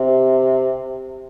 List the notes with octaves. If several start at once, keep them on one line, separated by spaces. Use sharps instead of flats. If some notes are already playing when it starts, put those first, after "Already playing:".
Already playing: C3